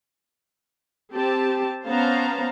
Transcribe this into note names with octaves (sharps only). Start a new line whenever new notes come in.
C4 G4 A5
B3 C#4 C5 F5 A5 A#5